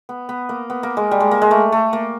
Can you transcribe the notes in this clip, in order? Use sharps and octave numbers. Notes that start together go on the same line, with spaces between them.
B3
B3
A#3
B3
A#3
G#3
G3
G#3
A#3
G#3
A3
A3
A#3